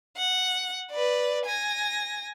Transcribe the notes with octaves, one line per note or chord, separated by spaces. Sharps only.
F#5
B4 D5
G#5 A#6